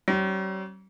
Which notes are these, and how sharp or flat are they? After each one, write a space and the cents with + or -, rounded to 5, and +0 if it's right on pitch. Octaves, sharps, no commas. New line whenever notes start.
G3 -45 C#4 -35